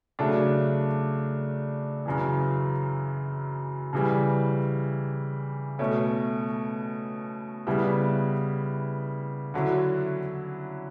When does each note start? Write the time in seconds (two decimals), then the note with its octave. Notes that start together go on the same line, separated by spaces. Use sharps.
0.19 C#3 F#3 A3 D4
2.06 F#2 C#3 E3
3.93 C#3 E3 G3
5.79 B2 A3 C#4
7.67 C#3 G3 B3 E4
9.54 D3 F#3 C#4 E4